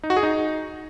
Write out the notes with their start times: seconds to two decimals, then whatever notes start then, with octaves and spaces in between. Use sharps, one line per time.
0.03 D#4
0.10 F#4
0.17 G#4
0.23 D#4